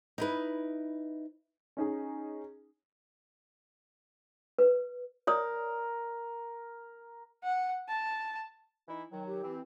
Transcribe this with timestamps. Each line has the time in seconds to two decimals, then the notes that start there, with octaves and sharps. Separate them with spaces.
0.18 D#4 E4 B4
1.77 C#4 D#4 G#4
4.58 B4
5.27 A#4 C#5 D5 D#6
7.43 F#5
7.88 A5
8.88 E3 D#4 E4
9.12 D#3 F#3 G5
9.26 G4
9.43 E3 C4